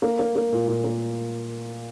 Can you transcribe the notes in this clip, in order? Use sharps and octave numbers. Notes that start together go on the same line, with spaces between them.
A#3
A#3
A#3
A#2
A#2
A#3